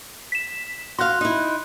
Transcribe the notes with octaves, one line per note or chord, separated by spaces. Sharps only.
B6 E7
F#4 F5 C6 F#6
D#4 E4